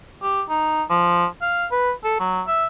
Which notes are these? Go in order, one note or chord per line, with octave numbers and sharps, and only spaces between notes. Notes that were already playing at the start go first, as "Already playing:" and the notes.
G4
D#4
F3
F5
B4
A4
F#3
E5